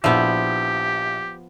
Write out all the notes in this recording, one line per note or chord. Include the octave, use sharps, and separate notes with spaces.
A#1 F3 B3 E4 G4 E6